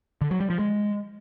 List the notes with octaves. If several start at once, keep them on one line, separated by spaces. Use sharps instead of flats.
D3
F#3
G3
F3
G#3